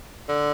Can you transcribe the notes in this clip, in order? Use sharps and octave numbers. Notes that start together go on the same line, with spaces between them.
D3